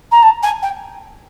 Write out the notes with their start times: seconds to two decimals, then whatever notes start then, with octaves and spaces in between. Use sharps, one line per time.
0.11 A#5
0.23 A5
0.43 G#5
0.62 G5